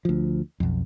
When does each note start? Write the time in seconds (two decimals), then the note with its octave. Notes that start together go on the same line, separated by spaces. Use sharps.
0.05 D2 F3
0.60 B1 F2